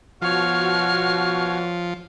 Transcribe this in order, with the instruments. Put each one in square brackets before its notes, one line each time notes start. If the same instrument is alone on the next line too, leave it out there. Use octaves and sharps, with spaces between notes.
[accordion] B2 F#4 [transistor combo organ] F3 [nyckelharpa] C#5 [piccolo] F6